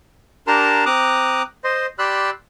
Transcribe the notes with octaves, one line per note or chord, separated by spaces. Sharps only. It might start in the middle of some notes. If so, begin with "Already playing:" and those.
D4 G4 A#4 A5 A#5 C6
C4 A#5 D6 D#6 F#6
C5 D#5 C6
G4 D5 B5 C6 E6 F#6